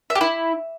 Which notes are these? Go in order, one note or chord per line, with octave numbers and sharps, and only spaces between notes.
E5
G4
E4